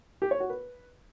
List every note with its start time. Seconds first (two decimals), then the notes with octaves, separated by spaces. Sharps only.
0.22 G4
0.31 C#5
0.40 F#4
0.50 B4